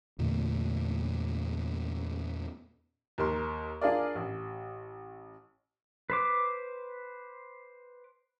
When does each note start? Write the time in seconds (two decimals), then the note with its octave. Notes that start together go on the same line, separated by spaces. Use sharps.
0.19 E2 A#2 D3 A3
3.18 D#2 A#4 C6
3.81 D4 F4 G#4 A#4 D5
4.15 A1
6.10 B4 C5 D6